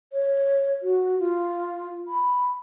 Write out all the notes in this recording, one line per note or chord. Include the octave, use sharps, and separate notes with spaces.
C#5
F#4
F4
B5